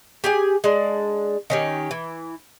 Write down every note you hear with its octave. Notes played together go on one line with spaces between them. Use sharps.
G4 G#4 G#5
G#3 D4
D#3 C#4 G4
E3